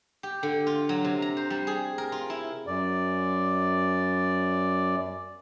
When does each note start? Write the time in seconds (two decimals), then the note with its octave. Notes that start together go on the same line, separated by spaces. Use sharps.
0.23 G4
0.43 D3
0.67 F4
0.89 F#3
1.04 C3
1.22 A#5
1.37 C5
1.50 G3
1.67 G#4
1.98 A#4
2.12 F4
2.30 E4
2.67 F#2 D5